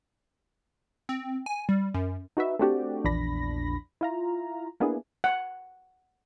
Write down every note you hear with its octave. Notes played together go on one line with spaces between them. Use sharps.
C4
G#5
G3
F#2
D#4 F#4 B4 E5
A3 C4 D4 F#4 G4 D5
A#1 E2 D4 B5 A#6
E4 F4 A#5
A#3 B3 D4 E4 G#4
F#5